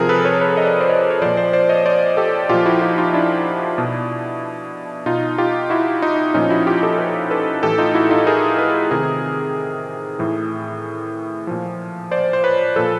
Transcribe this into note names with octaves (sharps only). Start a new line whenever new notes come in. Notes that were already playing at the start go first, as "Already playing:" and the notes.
Already playing: C3 F3 G#4 A#4
A4 B4
B4 C#5
B4 C#5
D#5
D5
C#5
C5 D5
C#5 D#5
C#5
A#2 F3 C5 D5
C5 D5
C5 D5
C#5 D#5
C5 D5
G4 A4
A#2 F3 F4 G4
E4 F#4
D#4 F4
D#4 F4
D4 E4
B2
B2 D#4 F4
F4 G4
E4 F#4
D#4 F4
A#2 F3 C#4 D#4
E4 F#4
F4 G4
G4 A4
A4 B4
A4 B4
A2 E3 G4 A4
D#4 F4
E4 F#4
D#4 F4
G#4 A#4
A4 B4
C3 D#3 G#4 A#4
A2 E3
A#2 F3
C5 D5
C5
B4 C#5
A#2 F3 A4 B4